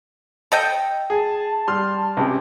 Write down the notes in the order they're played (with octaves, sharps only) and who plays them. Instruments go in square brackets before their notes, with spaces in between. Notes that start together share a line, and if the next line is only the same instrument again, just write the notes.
[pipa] A4 D#5 G5
[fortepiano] G#4 [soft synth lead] A5
[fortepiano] G3 C6 F6
C#2 C3 G4